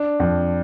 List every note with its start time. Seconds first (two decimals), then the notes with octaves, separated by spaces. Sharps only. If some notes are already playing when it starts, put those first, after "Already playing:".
Already playing: D4
0.20 F2